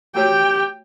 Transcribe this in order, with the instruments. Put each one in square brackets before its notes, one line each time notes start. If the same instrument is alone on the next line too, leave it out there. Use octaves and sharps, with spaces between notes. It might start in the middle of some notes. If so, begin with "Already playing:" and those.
[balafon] A3 F#4 C#5 [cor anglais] G4 [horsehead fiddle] G5